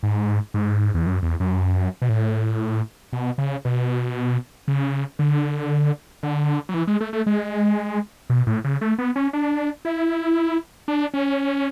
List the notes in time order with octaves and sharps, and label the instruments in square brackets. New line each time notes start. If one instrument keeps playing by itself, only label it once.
[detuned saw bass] G#2
G#2
E2
F#2
E2
F#2
B2
A2
B2
C#3
B2
C#3
D3
D3
F#3
E3
G#3
A3
A3
G#3
B2
A2
C#3
A3
B3
C#4
D4
E4
D4
C#4